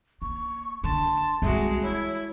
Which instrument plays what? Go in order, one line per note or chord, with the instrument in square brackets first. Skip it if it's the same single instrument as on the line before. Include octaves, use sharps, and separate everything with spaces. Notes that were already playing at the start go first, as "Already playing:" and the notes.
[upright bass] A#3 [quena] C#6
[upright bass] D3 [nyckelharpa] A5 [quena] C6
[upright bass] E1 C2 [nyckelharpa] G#3 F#4 [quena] E5
[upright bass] E3 [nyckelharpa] E4 [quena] C#5